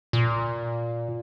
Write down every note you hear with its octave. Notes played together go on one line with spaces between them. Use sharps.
A#2